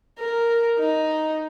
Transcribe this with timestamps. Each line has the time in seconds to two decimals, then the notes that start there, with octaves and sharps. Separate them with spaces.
0.19 A#4
0.79 D#4